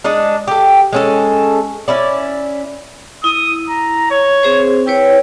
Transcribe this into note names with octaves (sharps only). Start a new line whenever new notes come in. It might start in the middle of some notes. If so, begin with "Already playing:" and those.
G#3 D4 D#4
G4 A4
G#3 C#4 A4
C#4 E4 D5
E4 D#6
A#5
C#5
C4 G#4 C5
E4 B4 C#5 G5